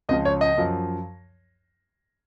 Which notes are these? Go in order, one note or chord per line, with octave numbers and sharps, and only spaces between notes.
C#2 C#3 F3 D#5
C#5
D#5
F#2 F3